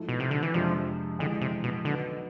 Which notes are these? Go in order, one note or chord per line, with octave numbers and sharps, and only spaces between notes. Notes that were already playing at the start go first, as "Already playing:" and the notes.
Already playing: G#2 F3 A3 E4
B2
C3
D3
E3
F2 C3 F3 G#3 D4
F2 D3 E3 G#3
C3
B2
B1 B2 D3 B3